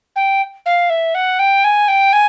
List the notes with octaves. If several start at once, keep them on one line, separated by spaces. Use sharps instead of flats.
G5
F5
E5
F#5
G5
G#5
G5
G#5